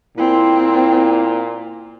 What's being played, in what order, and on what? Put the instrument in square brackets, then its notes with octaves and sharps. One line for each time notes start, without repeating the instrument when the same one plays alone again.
[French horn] A#2 [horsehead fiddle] C4 [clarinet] E4